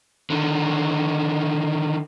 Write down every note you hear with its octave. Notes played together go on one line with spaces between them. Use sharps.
D3 D#3